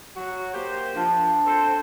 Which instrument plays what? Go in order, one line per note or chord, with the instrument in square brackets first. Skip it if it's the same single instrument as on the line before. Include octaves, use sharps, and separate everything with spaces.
[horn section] F#3 F#4
A#3 G4 C5
[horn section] F3 [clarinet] D4
[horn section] C4 A4 C5